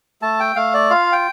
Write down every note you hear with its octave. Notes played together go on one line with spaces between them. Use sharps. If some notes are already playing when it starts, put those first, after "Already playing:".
A3 A5
G5
A3 F5
D5
F4 F5
G5